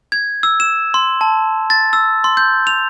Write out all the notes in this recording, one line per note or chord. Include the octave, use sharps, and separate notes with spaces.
G#6
E6
E7
C6
A5
A6
E6
C6
G6
F7